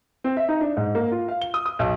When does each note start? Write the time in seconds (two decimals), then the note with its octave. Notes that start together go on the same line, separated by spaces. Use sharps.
0.24 C4
0.37 E5
0.49 D#4
0.61 D4
0.77 G#2
0.95 A#3
1.12 F4
1.28 F5
1.42 G7
1.54 D#6
1.66 D#6
1.79 B1